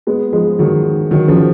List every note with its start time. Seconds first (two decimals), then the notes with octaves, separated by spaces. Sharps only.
0.07 G#3 B3
0.32 F3 G#3
0.59 D#3 F#3
1.11 D#3 F#3
1.28 C#3 F3